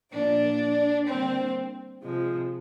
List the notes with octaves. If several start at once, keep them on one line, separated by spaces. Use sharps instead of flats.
A#2 F3 A#3 D4 D5
D3 G3 A#3 C4 C5
C3 F3 G#3